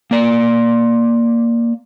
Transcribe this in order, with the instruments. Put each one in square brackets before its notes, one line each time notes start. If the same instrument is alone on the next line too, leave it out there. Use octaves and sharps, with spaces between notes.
[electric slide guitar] A#3 D5